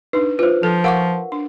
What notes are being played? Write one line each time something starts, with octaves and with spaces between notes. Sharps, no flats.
D4 D#4 B4
F4 B4 C5
F3 A4
A#4 F5 F#5 C#6 D6
D4